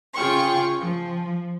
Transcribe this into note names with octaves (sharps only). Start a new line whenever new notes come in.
C#3 F4 G#4 G5 C#6
F3